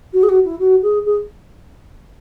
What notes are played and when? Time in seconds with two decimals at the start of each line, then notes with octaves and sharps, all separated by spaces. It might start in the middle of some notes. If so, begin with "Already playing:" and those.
0.13 F#4
0.23 G#4
0.29 F#4
0.44 E4
0.59 F#4
0.82 G#4
1.05 G#4